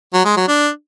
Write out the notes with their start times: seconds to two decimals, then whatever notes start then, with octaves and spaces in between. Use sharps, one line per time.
0.14 F#3
0.25 G#3
0.37 F#3
0.48 D4